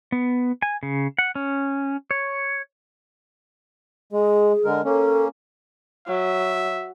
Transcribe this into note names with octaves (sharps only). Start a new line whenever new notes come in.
B3
G#5
C#3
F#5
C#4
C#5
G#3 G#4
D3 G#3 A#4
A#3 C#4 A4
F#3 E5